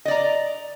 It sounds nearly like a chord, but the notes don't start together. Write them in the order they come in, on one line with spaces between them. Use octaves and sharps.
D#5 D5 A#5